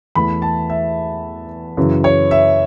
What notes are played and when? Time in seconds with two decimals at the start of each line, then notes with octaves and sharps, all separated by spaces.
0.15 E2 E3 A3 B5
0.42 A5
0.70 E5
1.77 F#2 C#3 E3
2.04 C#5
2.31 E5